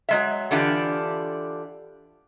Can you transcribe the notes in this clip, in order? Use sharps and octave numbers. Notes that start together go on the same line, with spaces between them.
F#3 G#3 E5
D3 E3 D4 F4 G4